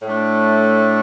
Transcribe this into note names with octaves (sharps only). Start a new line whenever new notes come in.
A2 A3 D4